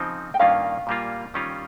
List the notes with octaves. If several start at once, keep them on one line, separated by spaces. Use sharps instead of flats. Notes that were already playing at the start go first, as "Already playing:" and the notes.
Already playing: C#3 F3 C4 D#4
G5
G2 D#3 A#3 C#4 F4 F5
A#2 G3 A#3 F4
D#3 G3 C#4 F4